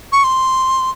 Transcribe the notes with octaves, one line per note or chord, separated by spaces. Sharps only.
C#6
C6